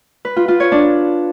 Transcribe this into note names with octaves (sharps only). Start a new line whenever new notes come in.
B4
F4
F4
C#5
D4